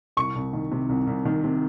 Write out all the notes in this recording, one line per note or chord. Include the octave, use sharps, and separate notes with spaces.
C2 C#6
C2
D#3
C3
C2
C2
D#3
C3